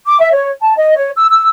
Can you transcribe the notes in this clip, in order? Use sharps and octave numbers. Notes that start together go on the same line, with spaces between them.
D6
E5
C#5
A5
D#5
C#5
E6
E6